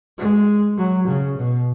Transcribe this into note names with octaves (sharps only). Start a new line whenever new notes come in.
G#3
F#3
C#3
B2